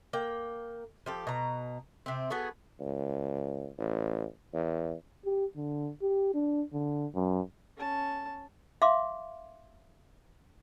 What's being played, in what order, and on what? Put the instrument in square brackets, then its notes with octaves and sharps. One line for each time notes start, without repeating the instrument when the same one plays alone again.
[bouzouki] A#3 G5
F3 G4 A4
B2 A#5
C3 C4
B3 F#4 G#4 A4
[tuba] C#2
A1
E2
[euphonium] G4
D3
G4
D4
D3
F#2
[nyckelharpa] C#4 A5
[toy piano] E5 F5 C6 D6